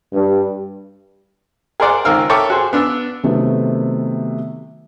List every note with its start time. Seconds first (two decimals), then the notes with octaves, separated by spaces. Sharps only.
0.13 G2
1.80 G#4 A#4 C5 D5 F#5
2.05 C#2 D#3 C4 A#4 F5 E6
2.30 A4 A#4 C#5 E5 G5 D6
2.50 F#4 G#4 C5
2.73 B3 D4 E6
3.23 C3 D#3 F#3 A3 B3 C4